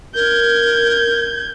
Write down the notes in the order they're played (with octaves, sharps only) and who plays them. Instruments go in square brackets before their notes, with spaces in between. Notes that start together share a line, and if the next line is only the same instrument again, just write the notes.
[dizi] A#4 [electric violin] G6 G#6